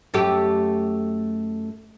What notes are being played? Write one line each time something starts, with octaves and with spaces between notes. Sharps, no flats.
F#2 A3 G4